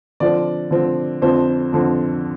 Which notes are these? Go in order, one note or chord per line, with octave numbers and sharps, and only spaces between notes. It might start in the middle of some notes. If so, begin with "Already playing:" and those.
D3 F3 C4 D5
D3 F3 C4
F2 D3 F3 C4 C5
F2 D3 F3 C4